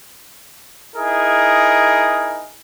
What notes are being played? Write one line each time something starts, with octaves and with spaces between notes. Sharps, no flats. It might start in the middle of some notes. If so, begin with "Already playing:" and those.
D#4 E4 G#4 A#4